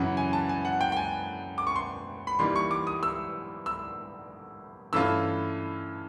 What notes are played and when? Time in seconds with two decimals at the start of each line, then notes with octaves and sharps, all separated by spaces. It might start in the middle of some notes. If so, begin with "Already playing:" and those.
Already playing: F#2 C#3 E3 F#5
0.17 G#5
0.33 A5
0.49 G#5
0.65 F#5
0.81 G5
0.92 G5
0.97 G#5
1.58 D6
1.67 C#6
1.76 C6
2.27 B5
2.39 E3 G3 A#3 D#4 C6
2.56 C#6
2.71 D6
2.87 D#6
3.03 E6
3.66 E6
4.93 G2 E3 A3 C#4 F4 E6